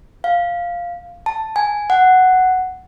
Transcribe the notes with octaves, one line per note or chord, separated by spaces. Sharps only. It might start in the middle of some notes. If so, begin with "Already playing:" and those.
F5
A5
G#5
F#5